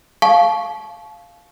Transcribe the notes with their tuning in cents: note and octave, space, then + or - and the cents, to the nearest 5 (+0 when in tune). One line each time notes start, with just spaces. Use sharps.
F5 +0 A5 -35 C#6 -5